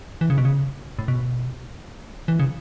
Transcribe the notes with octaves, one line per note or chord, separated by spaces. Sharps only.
E3
C#3
B2
C#3
A2
B2
E3
C#3